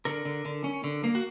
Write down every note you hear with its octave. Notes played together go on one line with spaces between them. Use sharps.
D3 A#4
D3
D3
C#4
D3
A#3
F#4